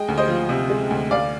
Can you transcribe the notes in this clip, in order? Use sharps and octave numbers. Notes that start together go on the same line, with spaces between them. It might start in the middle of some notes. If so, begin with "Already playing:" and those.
Already playing: G#3 D#5 G5
D2
C5 D#5
F3
C3
G#3
D2
D2 D5 F5